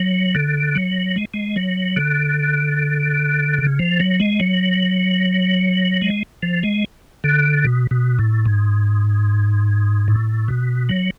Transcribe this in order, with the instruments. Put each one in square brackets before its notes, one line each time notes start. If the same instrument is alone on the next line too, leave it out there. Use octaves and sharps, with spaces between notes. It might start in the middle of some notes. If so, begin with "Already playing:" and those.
Already playing: [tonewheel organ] F#3
D3
F#3
G#3
G#3
F#3
D3
C#3
F3
F#3
G#3
F#3
G#3
F3
G#3
D3
B2
B2
A2
G#2
A2
B2
F#3